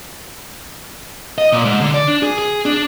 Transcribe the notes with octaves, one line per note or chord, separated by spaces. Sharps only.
D#5
A#2
G#2
D3
D5
D4
G#4
G#4
D4